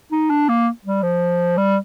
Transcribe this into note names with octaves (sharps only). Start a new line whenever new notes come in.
D#4
D4
A#3
G3
F3
G3